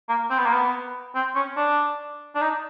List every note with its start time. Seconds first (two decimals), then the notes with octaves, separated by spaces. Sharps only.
0.09 A#3
0.30 C4
0.38 B3
0.46 A#3
0.53 B3
1.15 C4
1.35 C#4
1.57 D4
2.35 D4
2.41 D#4